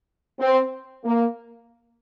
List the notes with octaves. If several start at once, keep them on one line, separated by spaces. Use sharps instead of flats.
C4
A#3